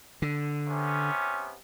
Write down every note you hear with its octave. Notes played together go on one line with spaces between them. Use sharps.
D3
C3 B3 C#4